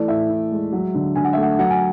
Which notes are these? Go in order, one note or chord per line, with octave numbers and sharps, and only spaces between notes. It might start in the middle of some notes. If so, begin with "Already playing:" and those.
Already playing: E3 A3 D5
A2 E5
A2
G#3
F#3
D3
D3 G#5
F#5
E5
A3 F#5
F#3 F#5
G#5